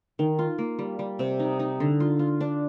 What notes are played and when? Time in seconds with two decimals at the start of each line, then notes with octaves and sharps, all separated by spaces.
0.19 D#3
0.39 F4
0.58 A#3
0.79 G3
0.99 G3
1.19 C3
1.39 D#4
1.59 D#4
1.80 D3
2.00 F4
2.19 F4
2.41 D4